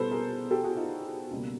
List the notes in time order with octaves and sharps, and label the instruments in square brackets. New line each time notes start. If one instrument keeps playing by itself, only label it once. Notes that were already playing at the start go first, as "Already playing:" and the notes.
Already playing: [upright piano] B2 G3 B3 A4 B4 C5
G#4 A#4
G4 A4
F#4 G#4
D#4 F4
C#2 B2 G3 A#3